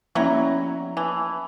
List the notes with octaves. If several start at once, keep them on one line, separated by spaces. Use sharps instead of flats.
F3 F#3 A#3 C#4 E4 A#5
E3 G#5 A5